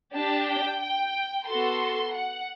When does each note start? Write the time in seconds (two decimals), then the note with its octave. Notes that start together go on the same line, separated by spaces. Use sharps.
0.14 D4 G4 A5
0.48 G5
0.82 G5
1.48 B3 F#4 A4 C6
2.14 F#5